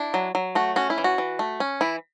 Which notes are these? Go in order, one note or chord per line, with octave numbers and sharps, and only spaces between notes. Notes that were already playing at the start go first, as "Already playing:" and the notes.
Already playing: D4 E4
F#3
F#3
A3 F#4
C#4 F#4
E4
E3
F#4
E3
A3
C#4
E3 E4